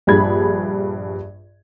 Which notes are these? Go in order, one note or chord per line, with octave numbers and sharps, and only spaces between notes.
A#1 G2 G#4 B5 G#6